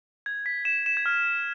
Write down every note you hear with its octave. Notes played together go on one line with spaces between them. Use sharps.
G#6
B6
E7
E7
G#6
F6